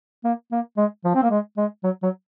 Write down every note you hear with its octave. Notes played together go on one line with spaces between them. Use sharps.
A#3
A#3
G#3
F3
C4
A#3
G#3
G#3
F#3
F#3